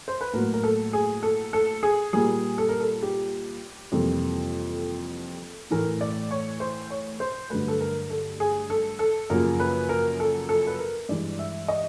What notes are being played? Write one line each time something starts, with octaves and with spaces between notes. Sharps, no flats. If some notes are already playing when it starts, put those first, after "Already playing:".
C5
B4
A2 F#3 A#3 A#4
A#4
A4
G#4
A4
A4
G#4
A#2 G3 A#3 G#4
A4
A#4
A4
G4
F2 C3 E3 G3 A#3 A4
A2 E3 A3 A#4
D5
C#5
C5
C#5
C5
G2 D3 F#3 A3 B4
A4
A#4
A4
G#4
A4
A4
F#2 C#3 F3 A#3 A#4
B4
A#4
A4
A4
B4
A#4
G2 E3 G#3 D5
E5
D#5